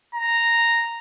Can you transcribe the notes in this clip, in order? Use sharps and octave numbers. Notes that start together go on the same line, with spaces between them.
A#5